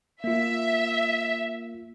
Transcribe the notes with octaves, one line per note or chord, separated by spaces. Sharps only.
A#3 F4 E5